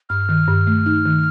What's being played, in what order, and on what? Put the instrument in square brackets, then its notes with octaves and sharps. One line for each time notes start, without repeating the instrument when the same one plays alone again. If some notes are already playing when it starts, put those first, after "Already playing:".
[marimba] G2 [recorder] F6
[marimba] D#3
G2
A3
D#4
D#3